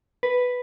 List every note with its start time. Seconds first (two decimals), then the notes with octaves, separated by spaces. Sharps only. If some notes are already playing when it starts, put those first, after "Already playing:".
0.23 B4